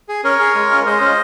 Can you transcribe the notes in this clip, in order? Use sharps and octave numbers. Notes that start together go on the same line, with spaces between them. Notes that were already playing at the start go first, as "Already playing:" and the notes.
G#4
C#4 A#4 C#5
G#4
G#3
C#4 F4
G#3 C5 D#5
C#4 F4